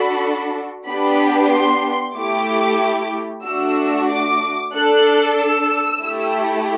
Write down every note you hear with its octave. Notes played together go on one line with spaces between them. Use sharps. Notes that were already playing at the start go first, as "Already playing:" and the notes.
Already playing: D4 F#4 A4 B5
B3 D4 G4 B5
C6
A3 E4 G4 D6
A3 D4 F#4 E6
D6
D4 A4 F#6
E6
A3 E4 G4